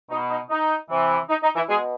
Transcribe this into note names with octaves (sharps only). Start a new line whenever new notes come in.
B2 D#4
D#4
D#4
C3 E3
D#4
D#4
E3 E4
B2 G#3 G#4